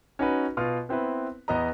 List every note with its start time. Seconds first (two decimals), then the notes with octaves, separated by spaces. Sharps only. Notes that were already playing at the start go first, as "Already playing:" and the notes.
0.19 C#4 D#4 F#4 B4
0.57 B2 F4 F6
0.89 B3 C4 E4 B4
1.48 E2 B3 D#5 A#5